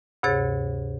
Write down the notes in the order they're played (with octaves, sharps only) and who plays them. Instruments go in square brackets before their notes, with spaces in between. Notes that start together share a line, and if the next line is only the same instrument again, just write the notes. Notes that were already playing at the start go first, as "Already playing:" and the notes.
[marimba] D2 G2 C3 G#4 C#5 A6